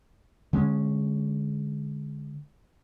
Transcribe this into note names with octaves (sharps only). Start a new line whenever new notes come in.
D3 G#3 C#4